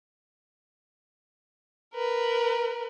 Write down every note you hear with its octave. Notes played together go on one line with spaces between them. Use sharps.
A#4 B4